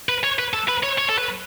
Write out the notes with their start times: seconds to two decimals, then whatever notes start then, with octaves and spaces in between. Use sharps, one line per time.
0.09 B4
0.24 C#5
0.39 B4
0.54 A4
0.69 B4
0.84 C#5
0.99 C#5
1.09 A4
1.18 B4